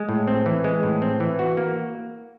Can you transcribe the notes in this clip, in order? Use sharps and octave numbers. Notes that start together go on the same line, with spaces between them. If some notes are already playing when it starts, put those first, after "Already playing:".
Already playing: G#3
A2
C4
E3
G#3
A2
C4
E3
F#4
A#3